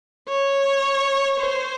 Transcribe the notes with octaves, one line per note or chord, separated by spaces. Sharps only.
C#5
C5